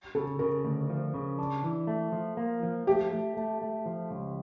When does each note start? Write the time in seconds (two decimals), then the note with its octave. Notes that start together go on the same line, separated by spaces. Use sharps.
0.15 C#3 A4
0.39 C#3 A#4
0.65 D2
0.90 F3
1.14 C#3
1.38 D4
1.64 E3
1.87 A3
2.12 F3
2.37 A#3
2.63 F3
2.87 A3 G4
3.12 A3
3.37 A3
3.62 A3
3.86 F3
4.11 C#2